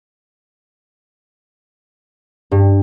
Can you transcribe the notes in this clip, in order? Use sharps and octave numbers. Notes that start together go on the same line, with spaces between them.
G2